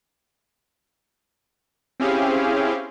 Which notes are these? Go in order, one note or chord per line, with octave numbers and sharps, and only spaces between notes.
C4 C#4 E4 G4 G#4 F5